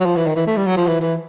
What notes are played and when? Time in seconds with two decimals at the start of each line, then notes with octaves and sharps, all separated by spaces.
0.01 F#3
0.06 F3
0.16 E3
0.27 D#3
0.36 E3
0.47 A3
0.57 G3
0.67 F#3
0.77 F3
0.87 E3
1.01 E3